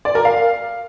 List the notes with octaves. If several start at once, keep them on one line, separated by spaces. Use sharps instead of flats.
D5
A#4
F5